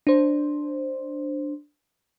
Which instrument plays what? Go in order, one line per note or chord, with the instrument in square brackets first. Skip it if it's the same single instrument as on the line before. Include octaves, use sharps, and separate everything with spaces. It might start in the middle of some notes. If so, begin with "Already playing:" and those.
[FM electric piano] D4 C5